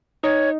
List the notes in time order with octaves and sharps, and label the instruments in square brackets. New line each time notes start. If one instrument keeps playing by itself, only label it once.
[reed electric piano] D#4 D#5 [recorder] C#5